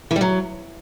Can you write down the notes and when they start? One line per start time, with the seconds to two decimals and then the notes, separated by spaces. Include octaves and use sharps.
0.11 E3
0.16 G3
0.21 F#3